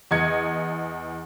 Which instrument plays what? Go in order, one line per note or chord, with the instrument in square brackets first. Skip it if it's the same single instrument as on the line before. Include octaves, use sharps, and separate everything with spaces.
[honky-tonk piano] E2 D#5 G#6 C#7